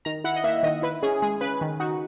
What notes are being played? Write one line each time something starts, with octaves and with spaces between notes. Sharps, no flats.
D#3 A#5
E4 F#5
D#5
A#3 E5
D#3 D#5
E4 B4
C#4 G#4
G#3 G#4
C#3 B4
D#3
D#4 F#4